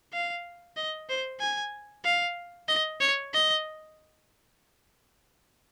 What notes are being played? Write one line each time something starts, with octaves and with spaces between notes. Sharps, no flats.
F5
D#5
C5
G#5
F5
D#5
C#5
D#5